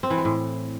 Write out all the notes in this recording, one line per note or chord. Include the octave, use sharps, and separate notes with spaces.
C4
E3
G#3
A2